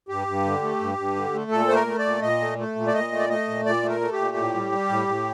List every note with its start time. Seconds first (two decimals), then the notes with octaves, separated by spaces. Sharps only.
0.09 G2 G4
0.27 G2
0.45 D3
0.63 A3
0.81 G2
0.98 G2
1.16 D3
1.34 A3
1.51 A#2 A4
1.68 A3 C5
1.75 A#4
1.87 A3
1.99 D5
2.05 A#2
2.22 A#2 D#5
2.40 A3
2.58 A3
2.76 A#2
2.87 D5
2.94 A#2 D#5
3.12 A3
3.19 D5
3.29 A3 D#5
3.47 A#2
3.66 A#2 D5
3.83 A3
3.88 A#4
4.01 A3
4.13 G4
4.18 A#2
4.36 A2
4.54 G3
4.72 G3
4.89 A2
5.07 A2